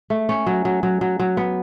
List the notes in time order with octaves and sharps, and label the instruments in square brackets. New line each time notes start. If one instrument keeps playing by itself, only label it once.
[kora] A3
C#4
F#3
F#3
F#3
F#3
F#3
B3